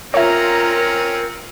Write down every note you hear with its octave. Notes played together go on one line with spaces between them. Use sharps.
C4 C#4 F4 A#4 C#5 E5 A#5